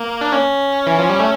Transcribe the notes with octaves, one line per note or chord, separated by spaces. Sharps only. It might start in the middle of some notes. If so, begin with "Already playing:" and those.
Already playing: A#3
D4
C#4
E3
F3
G3
A3